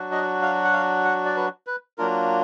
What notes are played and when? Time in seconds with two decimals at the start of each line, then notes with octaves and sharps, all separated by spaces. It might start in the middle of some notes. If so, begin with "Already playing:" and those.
Already playing: F#3 D4 F#4
0.12 D#5
0.42 F5
0.64 F#5
0.73 F5
1.05 F#5
1.25 D5
1.37 B4
1.67 B4
1.98 F#3 A#3 D4 F4 A#4